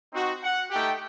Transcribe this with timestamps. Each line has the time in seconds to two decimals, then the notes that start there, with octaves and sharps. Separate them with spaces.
0.12 C4 D#4 F#4
0.42 F#5
0.71 A3 D#4 G4 G5